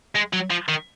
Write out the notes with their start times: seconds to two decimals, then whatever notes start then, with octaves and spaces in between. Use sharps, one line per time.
0.16 G#3
0.33 F#3
0.51 F3
0.68 D#3